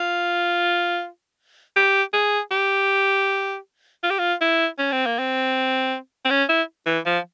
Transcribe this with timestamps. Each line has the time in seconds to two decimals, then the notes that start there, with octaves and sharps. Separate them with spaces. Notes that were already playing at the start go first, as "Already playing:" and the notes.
Already playing: F4
1.76 G4
2.13 G#4
2.51 G4
4.03 F4
4.10 G4
4.19 F4
4.41 E4
4.79 C#4
4.92 C4
5.06 A#3
5.19 C4
6.25 C4
6.30 C#4
6.49 E4
6.86 E3
7.05 F3